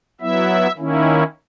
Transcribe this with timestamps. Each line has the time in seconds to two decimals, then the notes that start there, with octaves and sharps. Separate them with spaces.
0.21 F#3 B3 E4 E5
0.78 D#3 A#3 C#4 E4